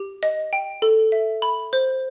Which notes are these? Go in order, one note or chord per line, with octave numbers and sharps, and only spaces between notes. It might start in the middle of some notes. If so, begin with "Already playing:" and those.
Already playing: G4
D#5
G5
A4
E5
B5
C5